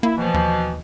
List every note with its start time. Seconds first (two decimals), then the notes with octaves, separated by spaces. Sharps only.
0.03 A#3 E4
0.17 B2 E3 F3
0.34 D#2